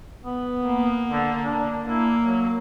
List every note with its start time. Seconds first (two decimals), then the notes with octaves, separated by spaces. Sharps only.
0.24 B3
0.66 A#3
1.10 D3
1.43 D4
1.87 A#3 E4
2.20 F#3